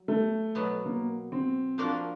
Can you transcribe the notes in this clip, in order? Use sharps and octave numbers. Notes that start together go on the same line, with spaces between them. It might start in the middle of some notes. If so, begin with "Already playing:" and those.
Already playing: F#3
A3
B2 F#3 B3
A#3
C4
F3 A#3 D4 F#4 A#4